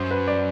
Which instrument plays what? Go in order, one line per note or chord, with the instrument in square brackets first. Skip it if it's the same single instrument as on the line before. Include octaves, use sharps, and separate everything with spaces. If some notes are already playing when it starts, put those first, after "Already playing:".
Already playing: [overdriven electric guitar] F#2 [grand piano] C5
[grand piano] B4
D5